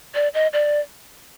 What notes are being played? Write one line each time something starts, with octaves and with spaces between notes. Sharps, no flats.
D5
D#5
D5